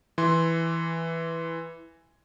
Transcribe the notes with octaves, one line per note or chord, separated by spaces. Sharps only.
E3 C6